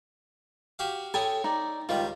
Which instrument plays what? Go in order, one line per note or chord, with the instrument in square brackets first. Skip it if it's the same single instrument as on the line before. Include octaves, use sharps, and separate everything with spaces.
[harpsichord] F#4 G4 F5
[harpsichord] E4 C#5 G#5 [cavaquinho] A4 G5 D#6
[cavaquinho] D#4 D5
[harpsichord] C#2 D#3 G3 [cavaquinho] F4